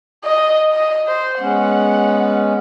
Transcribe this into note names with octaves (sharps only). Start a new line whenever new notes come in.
D#5
D#5
C5
G#3 B3 C#4 F#5